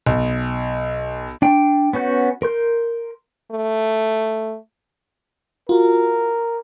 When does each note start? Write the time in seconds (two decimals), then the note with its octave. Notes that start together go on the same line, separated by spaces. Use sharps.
0.06 B1
1.42 D4 G5
1.93 B3 C#4 F#4 G6
2.42 A#4 C6 G6
3.51 A3
5.69 F4 F#4 A#4